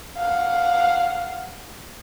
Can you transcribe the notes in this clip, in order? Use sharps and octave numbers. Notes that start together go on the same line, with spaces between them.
F5 F#5